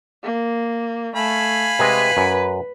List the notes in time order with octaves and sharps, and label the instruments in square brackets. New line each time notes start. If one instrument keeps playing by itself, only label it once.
[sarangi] A#3
[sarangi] A3 [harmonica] F5 G#5 B5
[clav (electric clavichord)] C3 G#3 [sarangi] B4
[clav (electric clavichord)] F#2